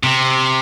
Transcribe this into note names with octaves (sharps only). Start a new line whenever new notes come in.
C3